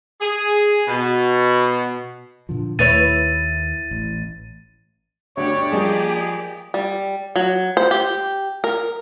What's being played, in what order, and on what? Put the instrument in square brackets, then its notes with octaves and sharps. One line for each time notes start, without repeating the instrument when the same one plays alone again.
[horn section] G#4
B2
[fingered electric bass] A#2 D3 F3
[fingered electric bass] D#2 [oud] E4 B4 C#5 [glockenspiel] A6 D#7
[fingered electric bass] A1
[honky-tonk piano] G1 D2 F#4 [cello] G4 D5 [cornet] C#5
[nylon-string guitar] F3 G3 A#3 [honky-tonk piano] G#3 [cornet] G#4
[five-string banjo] G3
F#3
C5
G4
A#4